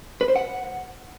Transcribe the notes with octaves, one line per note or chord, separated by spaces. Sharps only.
B4
C5
F#5